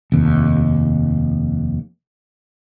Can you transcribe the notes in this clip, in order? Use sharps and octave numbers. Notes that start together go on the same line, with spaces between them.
F1 D#2